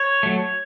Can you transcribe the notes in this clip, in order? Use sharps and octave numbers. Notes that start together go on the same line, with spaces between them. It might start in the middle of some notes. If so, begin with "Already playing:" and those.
Already playing: C#5
F#3 A3